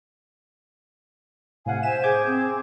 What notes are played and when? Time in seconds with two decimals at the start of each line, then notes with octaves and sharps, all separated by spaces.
1.66 A2 C3 F5 F#5 G#5
1.83 C5 E5 G#5 E7
2.03 G#4 D6 G6 G#6
2.26 C4